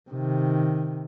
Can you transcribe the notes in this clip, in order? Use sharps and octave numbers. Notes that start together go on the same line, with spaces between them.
C3 D#3